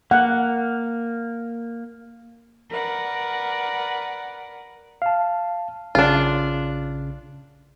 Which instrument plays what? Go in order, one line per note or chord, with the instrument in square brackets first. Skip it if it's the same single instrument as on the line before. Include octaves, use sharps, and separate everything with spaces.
[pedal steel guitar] A#3 [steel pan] F#5
[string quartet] A#4 B4 D5 F#5
[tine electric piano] F5 A5
[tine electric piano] A#1 C#3 F#6 [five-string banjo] D4 F4